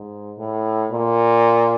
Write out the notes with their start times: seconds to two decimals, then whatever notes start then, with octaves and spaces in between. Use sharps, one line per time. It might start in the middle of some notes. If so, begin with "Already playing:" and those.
Already playing: G#2
0.38 A2
0.91 A#2